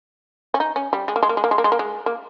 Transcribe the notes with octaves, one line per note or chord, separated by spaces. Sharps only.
C#4
D#4
C#4
G3
G#3
A#3
G#3
A#3
G#3
A#3
G#3
A#3
G#3
A#3
G#3
A#3